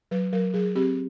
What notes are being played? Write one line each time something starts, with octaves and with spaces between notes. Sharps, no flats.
F#3 B4
F#3 A#4
F#3 G#4
C4 G4